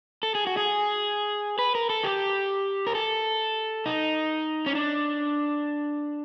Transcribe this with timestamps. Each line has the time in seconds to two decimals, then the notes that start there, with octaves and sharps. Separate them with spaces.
0.23 A4
0.35 G#4
0.47 F#4
0.57 G#4
1.59 B4
1.75 A#4
1.90 A4
2.04 G4
2.87 A#4
2.95 A4
3.86 D#4
4.66 C#4
4.75 D4